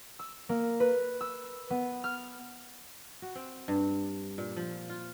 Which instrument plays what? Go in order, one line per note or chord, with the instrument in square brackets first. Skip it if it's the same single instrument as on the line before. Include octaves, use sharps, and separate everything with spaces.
[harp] E6
A#3
B4
E6
B3
F6
[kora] F#4
C4
G2
A#2
F3
F4